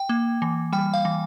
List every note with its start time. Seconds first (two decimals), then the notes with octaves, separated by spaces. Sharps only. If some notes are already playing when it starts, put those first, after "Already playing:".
Already playing: G5
0.09 A#3
0.42 E3
0.73 G3 G5
0.94 F5
1.05 E3